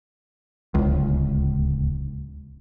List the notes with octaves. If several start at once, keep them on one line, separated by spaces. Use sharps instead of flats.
D1 C#2